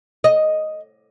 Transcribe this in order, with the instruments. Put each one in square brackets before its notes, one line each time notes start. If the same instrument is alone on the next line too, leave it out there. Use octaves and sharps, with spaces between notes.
[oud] D#5